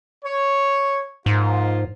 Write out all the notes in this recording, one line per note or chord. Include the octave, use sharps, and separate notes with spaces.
C#5
G#2 F3 A#3 F4